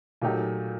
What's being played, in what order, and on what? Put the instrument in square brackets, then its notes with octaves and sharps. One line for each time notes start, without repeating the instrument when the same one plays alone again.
[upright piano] A#2 F#3 A3 D#4 G4